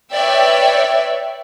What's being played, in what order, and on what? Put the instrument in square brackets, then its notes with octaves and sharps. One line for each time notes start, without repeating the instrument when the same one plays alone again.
[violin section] B4 C#5 D5 E5 G5